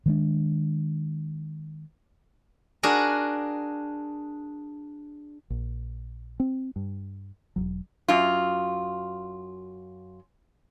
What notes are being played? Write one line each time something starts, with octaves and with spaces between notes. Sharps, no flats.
D#3 G#3 D4
D4 F#4 G#4 A#4
A#1
C4
G2
E1 C#2 F#3
F#2 F4